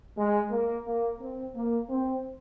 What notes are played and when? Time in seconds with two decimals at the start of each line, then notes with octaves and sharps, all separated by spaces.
0.16 G#3
0.51 A#3
0.86 A#3
1.20 C4
1.54 A#3
1.89 C4